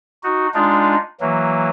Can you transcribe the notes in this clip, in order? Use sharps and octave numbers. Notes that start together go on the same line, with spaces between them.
D#4 F#4
G#3 D4 D#4 F4
E3 F#3 A#3